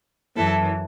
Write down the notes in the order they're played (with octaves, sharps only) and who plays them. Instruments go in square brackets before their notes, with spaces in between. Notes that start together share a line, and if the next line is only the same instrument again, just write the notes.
[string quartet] F#2 E3 E4 A4